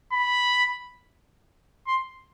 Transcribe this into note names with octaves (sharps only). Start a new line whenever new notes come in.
B5
C6